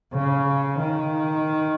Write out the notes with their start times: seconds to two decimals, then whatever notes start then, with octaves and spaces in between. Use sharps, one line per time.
0.13 C#3
0.79 D#3